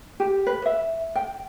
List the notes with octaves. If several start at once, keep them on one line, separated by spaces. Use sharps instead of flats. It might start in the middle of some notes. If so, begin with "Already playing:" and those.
G4
B4
E5
G5